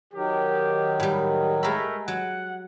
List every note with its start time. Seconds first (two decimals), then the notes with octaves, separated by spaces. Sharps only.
0.14 D#3 F#3 G4
1.00 A2 G3
1.63 G#3 A3 A#4 E5 B5
2.08 F#3 F#5